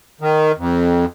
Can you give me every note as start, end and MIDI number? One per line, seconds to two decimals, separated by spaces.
0.21 0.52 51
0.57 1.05 41